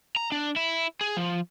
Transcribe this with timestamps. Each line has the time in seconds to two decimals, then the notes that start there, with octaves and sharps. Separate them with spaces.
0.16 A#5
0.32 D4
0.56 E4
1.01 G#4
1.17 F3